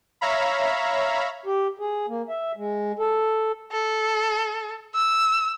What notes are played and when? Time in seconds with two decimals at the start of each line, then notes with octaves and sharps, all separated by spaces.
0.21 C#5 E5 F5 A#5 B5
1.46 G4
1.79 G#4
2.08 A#3
2.29 E5
2.57 G#3
2.99 A4
3.72 A4
4.95 E6